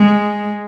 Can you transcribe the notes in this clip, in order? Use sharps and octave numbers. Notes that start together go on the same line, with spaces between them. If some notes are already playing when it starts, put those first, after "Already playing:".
Already playing: G#3